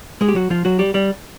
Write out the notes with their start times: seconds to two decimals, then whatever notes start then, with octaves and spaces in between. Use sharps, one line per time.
0.21 G#3 G#4
0.28 G4
0.35 F#3 F#4
0.50 F3 F4
0.65 F#3 F#4
0.79 G3 G4
0.94 G3 G4